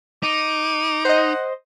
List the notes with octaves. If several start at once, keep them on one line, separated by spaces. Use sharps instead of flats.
D#4 D6
C5 D#5 F#5